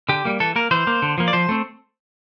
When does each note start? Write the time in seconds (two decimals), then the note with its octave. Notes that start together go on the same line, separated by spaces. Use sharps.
0.09 D3 G4
0.25 G3 A#3
0.40 E3 A4
0.56 A#3 A#4
0.71 E3 C5
0.87 A#3
1.02 D3
1.18 F3 A#3
1.28 D5
1.33 F3 C5
1.49 A3 C4